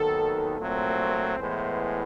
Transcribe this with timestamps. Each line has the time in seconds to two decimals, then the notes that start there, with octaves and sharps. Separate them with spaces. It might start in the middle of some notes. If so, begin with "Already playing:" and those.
Already playing: D#2 D#3 F#3 B3 A4
0.59 C2 A#2 F#3 A3 C4 C5
1.38 A2 E3 G#3 B3